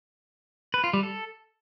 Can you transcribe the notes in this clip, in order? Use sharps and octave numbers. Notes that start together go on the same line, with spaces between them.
B4
F4
G3
A4